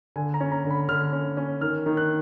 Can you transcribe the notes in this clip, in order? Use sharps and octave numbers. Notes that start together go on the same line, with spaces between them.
D3 G#5
A#5
C#4
A#5
D3
B5
D3 F6
C#4
C#4
D#3 F6
D#3
F#6